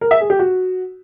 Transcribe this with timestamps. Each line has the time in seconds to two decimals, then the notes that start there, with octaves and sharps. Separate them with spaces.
0.01 A#4
0.11 E5
0.20 G#4
0.30 G4
0.39 F#4